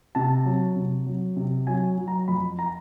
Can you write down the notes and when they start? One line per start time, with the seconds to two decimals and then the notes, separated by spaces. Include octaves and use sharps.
0.15 C3 A5
0.45 F#3
0.76 C3
1.06 F#3
1.36 C3
1.67 F#3 G#5
1.98 F#3
2.08 A#5
2.28 F2 B5
2.59 A#5